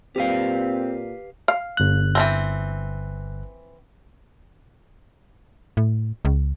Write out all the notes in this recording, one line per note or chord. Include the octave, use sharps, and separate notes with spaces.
A#2 C4 G4 B4 F5
F5
G1 F#6
E3 F3 C4
A2
C#2